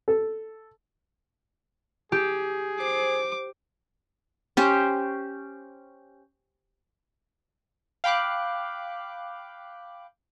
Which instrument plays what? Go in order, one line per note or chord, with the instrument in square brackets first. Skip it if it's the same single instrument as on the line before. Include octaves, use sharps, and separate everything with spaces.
[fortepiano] A4
[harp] G4 [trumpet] G#4
[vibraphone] C5 [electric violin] D6
[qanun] C#4 G4 C5
[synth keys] F5 G5 B5 D6 F#6